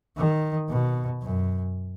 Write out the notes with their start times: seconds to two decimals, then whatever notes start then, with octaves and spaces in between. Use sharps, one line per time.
0.17 D#3
0.69 B2
1.22 F#2